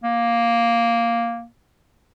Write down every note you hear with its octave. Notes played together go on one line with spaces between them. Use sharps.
A#3